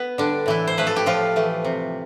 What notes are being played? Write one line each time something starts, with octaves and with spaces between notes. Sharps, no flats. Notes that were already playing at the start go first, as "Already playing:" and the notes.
Already playing: B3 B4
D3 G3 D4
A2 E3 E4
C5
F3 A3 B4
A4
G4
A2 F3 F4
E3 A3
C3